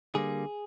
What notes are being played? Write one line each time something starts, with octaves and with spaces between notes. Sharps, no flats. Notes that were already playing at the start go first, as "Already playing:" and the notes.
D3 G3 A#3 G#4